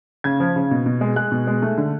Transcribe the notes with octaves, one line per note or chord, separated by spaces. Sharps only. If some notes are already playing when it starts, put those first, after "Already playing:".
C#3 G#6
F3
C#3
B2
B2
G#3
G#3 F#6
B2
G#3
A3
D3